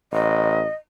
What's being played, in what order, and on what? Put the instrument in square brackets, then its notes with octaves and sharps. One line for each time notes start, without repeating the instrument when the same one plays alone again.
[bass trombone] A1 [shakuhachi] D#5